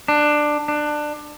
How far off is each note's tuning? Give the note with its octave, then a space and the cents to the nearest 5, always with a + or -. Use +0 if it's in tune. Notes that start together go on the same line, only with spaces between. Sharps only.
D4 +15
D4 +20